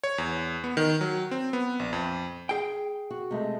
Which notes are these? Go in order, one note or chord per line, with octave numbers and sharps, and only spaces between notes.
C#5
E2
B3
D#3
F#3
C4
B3
A#1
F2
G#4 G5
F#4
C3 G#3 A3